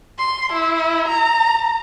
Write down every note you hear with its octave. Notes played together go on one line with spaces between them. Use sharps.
C6
E4
A#5